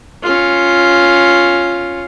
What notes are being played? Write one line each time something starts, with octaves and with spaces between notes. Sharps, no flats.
C#4 F4